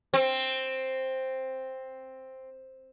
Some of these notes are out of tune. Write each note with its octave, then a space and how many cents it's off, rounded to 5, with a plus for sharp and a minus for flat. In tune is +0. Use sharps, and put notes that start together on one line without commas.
C4 +5